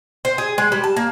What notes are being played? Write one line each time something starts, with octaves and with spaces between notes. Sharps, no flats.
C5
G#4
G#3
G3
A5
A#3